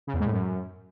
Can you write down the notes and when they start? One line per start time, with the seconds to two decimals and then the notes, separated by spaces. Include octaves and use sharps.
0.07 C#3
0.13 E2
0.20 G#2
0.26 A2
0.32 F#2